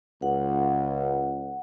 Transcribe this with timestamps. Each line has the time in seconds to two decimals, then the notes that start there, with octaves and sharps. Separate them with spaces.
0.22 C#2 F#5